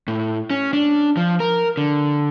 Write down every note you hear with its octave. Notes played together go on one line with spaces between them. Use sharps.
A2
C#4
D4
F3
A#4
D3